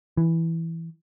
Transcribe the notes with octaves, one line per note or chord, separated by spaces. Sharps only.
E3